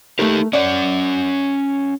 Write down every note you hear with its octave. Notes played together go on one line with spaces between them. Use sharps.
A3 D#4 G4 A#4
C#4 C#5 D5 F#5